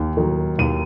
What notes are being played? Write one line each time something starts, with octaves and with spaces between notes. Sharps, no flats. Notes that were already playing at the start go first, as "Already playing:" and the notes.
Already playing: D#2
D#3 F#3
D#2 D#7